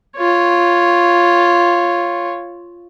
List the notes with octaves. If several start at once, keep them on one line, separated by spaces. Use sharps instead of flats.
F4 C#5